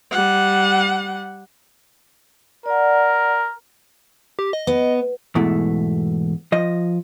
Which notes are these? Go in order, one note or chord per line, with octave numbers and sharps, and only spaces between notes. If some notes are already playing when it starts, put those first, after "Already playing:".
G3 F#5
A#4 D5 F#5
G4
D#5
B3
E2 G#2 B2 A3 E4
F3 D#5